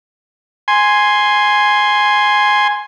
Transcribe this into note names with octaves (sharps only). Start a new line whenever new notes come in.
G#5 C6